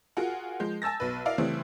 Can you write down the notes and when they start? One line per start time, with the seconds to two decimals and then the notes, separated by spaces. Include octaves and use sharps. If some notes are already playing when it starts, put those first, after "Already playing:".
0.17 F4 F#4 G#4 A#4 F#5
0.60 F3 G#3 G6
0.82 G#5 A5 E6 A6 A#6
1.00 B1 B4
1.25 E4 A#4 D5 E5 F5
1.38 C#3 E3 G3 A3 C4